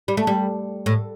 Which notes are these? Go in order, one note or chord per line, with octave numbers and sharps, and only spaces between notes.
G3
A3
G3
A2